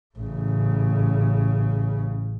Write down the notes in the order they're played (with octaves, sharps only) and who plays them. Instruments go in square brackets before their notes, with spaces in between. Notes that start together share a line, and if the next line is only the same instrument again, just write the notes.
[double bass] A1 C#3